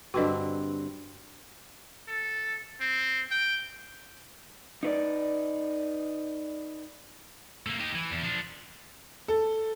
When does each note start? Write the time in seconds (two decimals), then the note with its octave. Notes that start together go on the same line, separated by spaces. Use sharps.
0.14 G2 D3 C4 F#4 B4 D#5
2.08 A4
2.81 C4
3.31 G5
4.83 D#4 B4 D5
7.67 A3 A#3
7.79 D#4 G4
7.95 E3
8.11 E2
8.24 F3 D4
9.28 A4